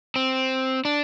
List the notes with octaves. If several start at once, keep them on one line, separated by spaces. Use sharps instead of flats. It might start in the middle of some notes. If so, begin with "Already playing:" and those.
C4
D4